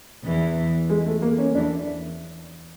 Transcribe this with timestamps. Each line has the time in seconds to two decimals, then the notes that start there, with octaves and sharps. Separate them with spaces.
0.24 E2 E3
0.90 G#3
1.06 A3
1.22 A#3
1.38 C#4
1.54 E2 E3 D4